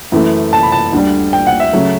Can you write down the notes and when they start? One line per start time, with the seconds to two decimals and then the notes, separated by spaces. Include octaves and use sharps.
0.12 F#2 E3 A3
0.53 A5
0.63 B5
0.72 A5
0.93 D2 D3 G3
1.33 G5
1.47 F#5
1.60 E5
1.73 C#3 F#3 A3